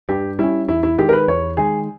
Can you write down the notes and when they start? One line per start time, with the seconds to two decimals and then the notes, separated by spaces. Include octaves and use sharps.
0.09 G2 G4
0.39 G3 C#4 E4
0.68 E2 E4
0.83 E4
0.98 D#3 G#3 G4
1.09 A#4
1.13 B4
1.28 E2 C#5
1.57 D#3 G#3 G#4